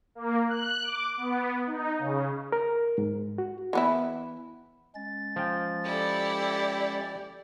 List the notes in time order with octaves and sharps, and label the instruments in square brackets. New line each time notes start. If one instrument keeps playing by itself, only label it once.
[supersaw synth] A#3
F#6
D6
B3
D#4
C#3
[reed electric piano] A#4
G#2
F#4
[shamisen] E3 B3 E4
[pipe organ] G#3 C#4 A6
[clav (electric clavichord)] F3 G5
[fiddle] E4 A4 [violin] G4 D5